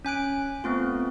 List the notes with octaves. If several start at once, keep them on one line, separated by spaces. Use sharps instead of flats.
C#4 G#5 F#6 D7
A3 B3 C4 F4